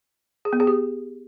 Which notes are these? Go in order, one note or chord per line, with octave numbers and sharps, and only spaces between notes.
G#4
B3
G#4
G4